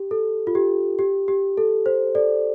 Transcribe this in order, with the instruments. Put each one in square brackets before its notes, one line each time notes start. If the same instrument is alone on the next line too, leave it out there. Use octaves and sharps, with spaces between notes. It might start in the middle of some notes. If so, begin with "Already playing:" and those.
Already playing: [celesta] G4
A4
F4
G4
G4
G4
A4
C5
A4 D5